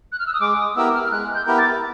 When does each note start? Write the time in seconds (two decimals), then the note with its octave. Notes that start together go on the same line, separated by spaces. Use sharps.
0.12 F#6
0.19 F6
0.27 E6
0.34 D#6
0.41 G#3 D6
0.59 D#6
0.76 B3 E4 G4 A#4 E6
0.94 F6
1.05 F6
1.11 G#3 F#6
1.35 G6
1.47 B3 E4 G4 A#4
1.58 A6